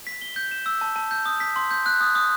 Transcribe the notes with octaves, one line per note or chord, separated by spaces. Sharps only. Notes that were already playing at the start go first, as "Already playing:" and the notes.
B6
G7
G6
E7
E6
A5
A5
G6
D#6
B6
C6
G6
F#6
D#6
D#6